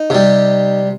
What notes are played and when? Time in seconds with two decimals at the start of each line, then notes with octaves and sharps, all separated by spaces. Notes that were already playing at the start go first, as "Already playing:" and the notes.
Already playing: D#4
0.10 C3 G3